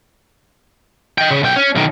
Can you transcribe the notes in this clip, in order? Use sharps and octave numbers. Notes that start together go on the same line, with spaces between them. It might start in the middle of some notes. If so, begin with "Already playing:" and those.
D#5 G5
C#3
B1 G5
C#4
B1 D#3